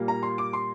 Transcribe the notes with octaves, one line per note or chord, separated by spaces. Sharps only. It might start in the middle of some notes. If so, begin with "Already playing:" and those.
Already playing: A#2 G3 A#3
A#5
C6
D6
C6